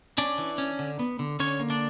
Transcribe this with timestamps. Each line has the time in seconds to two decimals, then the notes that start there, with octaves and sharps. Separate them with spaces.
0.18 C#4 D4 D5
0.38 E3
0.58 C#4
0.79 D3
0.99 B3
1.19 D3
1.40 D3 C#4 C#5
1.60 A#3
1.70 D4 D5